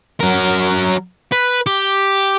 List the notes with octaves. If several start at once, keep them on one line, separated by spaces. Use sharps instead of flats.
F#3 A#4
B4
G4